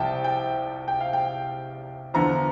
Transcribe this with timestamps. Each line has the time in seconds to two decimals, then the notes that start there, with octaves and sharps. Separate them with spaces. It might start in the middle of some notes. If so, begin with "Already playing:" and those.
Already playing: C2 C3 F3 G5 A5
0.24 G5
0.88 G5
1.01 F5
1.13 G5
2.14 E2 D3 F3 A#5